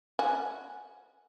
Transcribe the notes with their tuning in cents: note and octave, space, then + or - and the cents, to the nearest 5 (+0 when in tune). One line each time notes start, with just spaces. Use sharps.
F#4 +0 G#5 +0